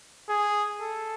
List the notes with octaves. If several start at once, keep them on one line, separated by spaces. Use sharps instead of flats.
G#4
A4